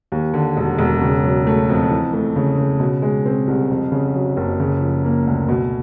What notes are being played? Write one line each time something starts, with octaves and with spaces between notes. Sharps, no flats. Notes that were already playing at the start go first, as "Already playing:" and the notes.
D#2
D3
E1
E1
C#3
F#3
A3
F2
E3
A3
C#3
C#3
B2
G#3
C4
C2
F2
C#3
F#3
F#1
C#3
F3
A#3
D2
B2